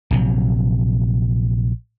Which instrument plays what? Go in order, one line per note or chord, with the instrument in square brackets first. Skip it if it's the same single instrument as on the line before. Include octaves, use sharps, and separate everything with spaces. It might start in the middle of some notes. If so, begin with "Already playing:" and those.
[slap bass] A#1 C3 D#3 F#3